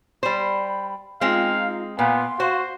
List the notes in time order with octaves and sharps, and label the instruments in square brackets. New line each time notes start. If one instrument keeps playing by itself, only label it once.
[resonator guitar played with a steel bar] G3 C5 [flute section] B5
[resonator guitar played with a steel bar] G#3 C4 [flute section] D#4 F4 [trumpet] F5
[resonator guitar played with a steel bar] A#2 [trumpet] B3 [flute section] F5 C6
[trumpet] F#4 [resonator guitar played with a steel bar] C5